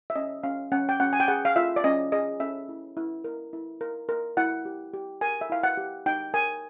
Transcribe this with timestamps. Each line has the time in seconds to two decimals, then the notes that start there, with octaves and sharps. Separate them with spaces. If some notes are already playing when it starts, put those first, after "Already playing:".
0.10 E5
0.15 C#4 D#5
0.43 C#4 F5
0.72 C#4 F#5
0.89 G5
1.00 C#4 F#5
1.13 G#5
1.20 G5
1.28 G#4 F#5
1.45 F5
1.56 F4 E5
1.76 D5
1.84 C#4 D#5
2.12 G#4 D#5
2.40 C#4 E5
2.69 E4
2.97 E4
3.24 A#4
3.53 E4
3.81 A#4
4.09 A#4
4.37 E4 F#5
4.65 G4
4.94 G4
5.21 A#4 G#5
5.41 E5
5.50 E4 F5
5.63 F#5
5.77 G4
6.06 D#4 G5
6.34 A#4 G#5